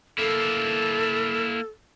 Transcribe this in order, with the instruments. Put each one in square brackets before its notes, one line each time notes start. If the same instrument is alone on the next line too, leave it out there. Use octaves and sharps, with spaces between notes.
[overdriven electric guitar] A#3 E4 [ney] A4